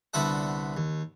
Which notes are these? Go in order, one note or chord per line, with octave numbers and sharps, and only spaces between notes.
C2 D3 B3 E5 F#5
D#2